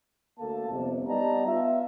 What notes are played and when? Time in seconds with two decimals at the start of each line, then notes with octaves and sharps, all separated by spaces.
0.39 D2 A#3 A4 A5
0.69 G1 F2 C3
1.08 G3 B3 D#4 D5 A5 A#5
1.46 B3 F4 E5